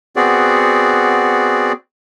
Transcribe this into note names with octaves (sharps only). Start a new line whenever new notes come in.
B3 C4 F#4 G#4 D5